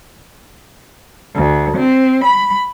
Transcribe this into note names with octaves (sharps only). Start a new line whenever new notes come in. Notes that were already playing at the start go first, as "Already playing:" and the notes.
D2
C4
B5